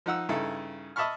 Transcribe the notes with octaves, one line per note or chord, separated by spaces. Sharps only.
F3 D#4 F#5 E6
G2 C#3 D#4 E4 A4
D#5 E5 A5 B5 C#6 F6